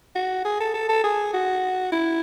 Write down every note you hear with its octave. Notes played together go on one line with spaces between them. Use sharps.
F#4
G#4
A4
A4
A4
G#4
F#4
E4